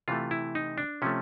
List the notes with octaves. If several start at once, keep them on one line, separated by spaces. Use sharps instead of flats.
C3 E3 A3 F4
E4
D#4
D4
C3 F3 A3 C#4